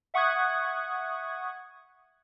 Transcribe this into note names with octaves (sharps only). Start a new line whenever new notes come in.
E5 F#5 C#6 D#6 F#6 G#6